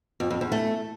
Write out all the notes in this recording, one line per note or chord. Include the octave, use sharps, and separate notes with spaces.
F2
F2
E2
A3